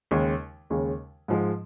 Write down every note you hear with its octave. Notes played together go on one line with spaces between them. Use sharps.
D#2 C#3 G#3
D#2 C#3 G#3
G#2 F3 G#3